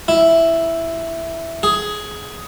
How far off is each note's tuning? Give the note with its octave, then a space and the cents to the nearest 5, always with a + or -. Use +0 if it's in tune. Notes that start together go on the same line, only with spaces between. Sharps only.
E4 +0
G#4 +10